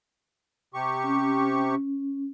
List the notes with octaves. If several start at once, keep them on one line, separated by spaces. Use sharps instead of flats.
C3 G4 C#6
C#4